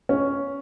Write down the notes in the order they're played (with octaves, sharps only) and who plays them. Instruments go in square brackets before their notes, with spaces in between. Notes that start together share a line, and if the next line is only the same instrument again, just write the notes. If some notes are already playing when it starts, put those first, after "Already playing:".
[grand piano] C#4